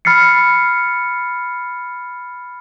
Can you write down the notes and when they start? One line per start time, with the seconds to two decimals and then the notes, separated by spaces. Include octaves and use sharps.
0.05 B5 F6 A6 C7 C#7